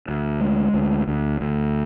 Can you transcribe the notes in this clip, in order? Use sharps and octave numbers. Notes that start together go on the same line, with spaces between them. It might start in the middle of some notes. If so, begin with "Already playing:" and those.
D2
G#3
D2
D2
D2